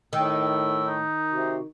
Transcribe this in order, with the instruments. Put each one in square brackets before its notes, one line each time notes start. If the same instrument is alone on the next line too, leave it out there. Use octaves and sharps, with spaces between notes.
[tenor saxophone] A2 [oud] D#3 [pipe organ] E6
[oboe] D#4
[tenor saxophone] C3 [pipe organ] F#4